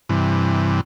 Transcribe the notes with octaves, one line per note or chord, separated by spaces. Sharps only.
G2 C3 E3